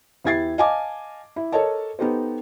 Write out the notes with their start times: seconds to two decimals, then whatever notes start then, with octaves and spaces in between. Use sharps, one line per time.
0.25 E2 E4 G4 G#6 A6 C7
0.58 D#5 F5 G#5 A5 D6
1.36 E4
1.52 A4 A#4 C#5 D#5 A5
1.99 B3 D#4 G4 A4 C5